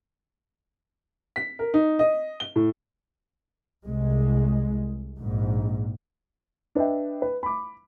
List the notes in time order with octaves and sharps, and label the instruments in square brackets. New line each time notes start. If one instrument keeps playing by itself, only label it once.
[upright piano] B6
A#4
D#4
D#5
G7
A2
[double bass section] C2 G#3
A#1 G#2
[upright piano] D4 B4 D#5 E5 G5
B4
B5 D6